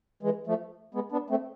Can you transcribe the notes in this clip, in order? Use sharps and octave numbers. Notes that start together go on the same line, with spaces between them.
E3 G#3
F3 A3
G#3 B3
B3 D4
A3 C4